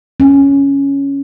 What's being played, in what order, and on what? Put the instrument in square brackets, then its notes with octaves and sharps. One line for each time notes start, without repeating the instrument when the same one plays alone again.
[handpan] C#4